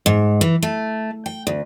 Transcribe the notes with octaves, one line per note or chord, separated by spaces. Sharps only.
G#2
E3
A3
G5
D2